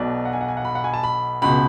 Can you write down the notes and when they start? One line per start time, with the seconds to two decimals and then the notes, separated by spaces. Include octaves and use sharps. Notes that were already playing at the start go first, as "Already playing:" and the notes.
Already playing: B1 B2 D5
0.25 F#5
0.33 G#5
0.41 F#5
0.48 G#5
0.57 F#5
0.64 B5
0.75 F#5
0.84 G#5
0.94 A5
1.03 B5
1.42 C#2 B2 B5